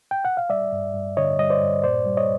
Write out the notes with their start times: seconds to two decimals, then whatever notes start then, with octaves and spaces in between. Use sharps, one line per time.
0.11 G5
0.25 F#5
0.37 F5
0.50 G3 D5 E5
0.72 G2
0.94 G2
1.17 D3 C#5 D#5
1.39 G3 D#5
1.50 C5 D5
1.62 G2
1.84 A#2 C5 D5
2.06 G3
2.17 C#5 D#5